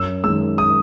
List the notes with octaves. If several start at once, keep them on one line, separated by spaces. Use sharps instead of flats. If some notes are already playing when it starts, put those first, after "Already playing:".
Already playing: F#2 E6
D#3 G#3 E6
D#6